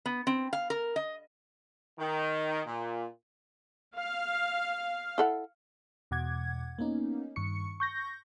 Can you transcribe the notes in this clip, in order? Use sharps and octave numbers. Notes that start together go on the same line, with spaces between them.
B3
C4
F5
A#4
D#5
D#3
A#2
F5
E4 A4 F#5
E2 B2 F#5 D6 G#6
A#3 B3 C#4 D#4
G2 D#3 C#6 C#7
C#6 G6 A#6